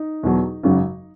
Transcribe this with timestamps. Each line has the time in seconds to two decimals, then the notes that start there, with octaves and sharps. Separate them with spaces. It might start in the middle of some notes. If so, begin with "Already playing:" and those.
Already playing: D#4
0.23 E2 B2 F#3
0.63 G#1 F#2 C#3 F#3